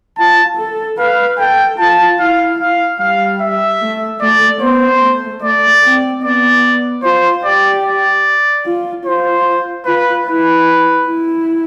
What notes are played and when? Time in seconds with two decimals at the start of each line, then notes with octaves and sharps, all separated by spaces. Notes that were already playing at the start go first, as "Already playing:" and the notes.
0.18 F4 A5
0.57 A4
0.99 B4 F5
1.38 A4 G5
1.79 F4 A5
2.20 E4 F5
2.60 F5
3.00 G3 F5
3.41 E5
3.81 A3
4.21 A3 D5
4.61 B3 C5
5.01 A3
5.42 A3 D5
5.83 C4
6.23 B3 D5
7.03 F4 C5
7.44 G4 D5
7.84 D5
8.66 F4
9.05 F4 C5
9.85 F4 B4
10.26 E4 B4
11.07 E4